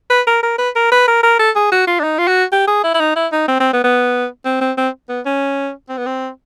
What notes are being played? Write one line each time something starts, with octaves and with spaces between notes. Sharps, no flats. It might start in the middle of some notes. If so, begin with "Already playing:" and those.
B4
A#4
A#4
B4
A#4
B4
A#4
A#4
A4
G#4
F#4
F4
D4
D#4
F4
F#4
G4
G#4
E4
E4
D#4
E4
D#4
C4
C4
B3
B3
C4
C4
C4
B3
C#4
C4
B3
C4